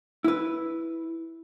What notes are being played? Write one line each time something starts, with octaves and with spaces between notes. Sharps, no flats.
E4 B4